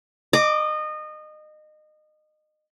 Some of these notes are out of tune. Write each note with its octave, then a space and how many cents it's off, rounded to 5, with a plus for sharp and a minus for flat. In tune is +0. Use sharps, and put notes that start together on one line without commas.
D#5 -25 D6 +5